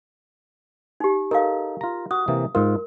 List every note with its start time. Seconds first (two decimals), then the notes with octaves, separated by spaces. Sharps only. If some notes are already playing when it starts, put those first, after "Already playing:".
1.00 D#4 G4
1.31 D#4 A4 A#4 F5
1.81 F4 A#5
2.11 F#4 D#6
2.28 C3 E3 A#3
2.55 G#2 F4 A#4